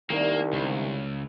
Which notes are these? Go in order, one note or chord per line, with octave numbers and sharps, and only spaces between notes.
C2 D#3 G3 A#3 D4
C#2